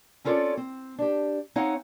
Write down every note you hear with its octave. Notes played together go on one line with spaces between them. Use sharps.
C4 C#4 F4 A4 C#5 D5
C4
D4 G4
C4 D#4 C#5 F5 F#5 G#5